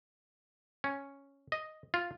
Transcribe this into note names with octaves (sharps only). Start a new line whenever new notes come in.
C#4
D#5
F4